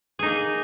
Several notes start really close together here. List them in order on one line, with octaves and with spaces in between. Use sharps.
G#4 D#4 A#3